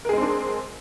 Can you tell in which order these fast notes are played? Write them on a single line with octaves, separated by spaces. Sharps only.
A#4 G#4 G#3 C4 D4